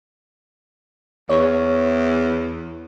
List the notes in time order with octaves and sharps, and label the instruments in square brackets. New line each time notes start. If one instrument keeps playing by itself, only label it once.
[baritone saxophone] E2 [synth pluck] C#5